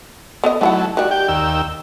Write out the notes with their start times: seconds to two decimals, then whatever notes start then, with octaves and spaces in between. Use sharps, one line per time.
0.44 B3 A4 D#5
0.61 F#3 A3 D#4 E4 F#5
0.97 D#3 G3 F#4
1.11 G4 G5
1.28 D#2 G5 E6